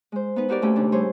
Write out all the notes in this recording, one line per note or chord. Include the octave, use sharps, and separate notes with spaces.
G#3 C5
B3 D#4 B4
D#4 F#4 G4 A#4 D5
A#2 A3 C#4 G4 B5
D#2 C#3 D4
G3 E4 G#4 C5 C#5